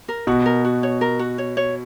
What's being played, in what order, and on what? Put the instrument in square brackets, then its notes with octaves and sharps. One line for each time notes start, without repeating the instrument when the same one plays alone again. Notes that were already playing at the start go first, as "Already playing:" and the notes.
[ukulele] A#4
[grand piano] B2 [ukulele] F#4
[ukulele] A#4
F#4
C#5
A#4
F#4
C#5
C#5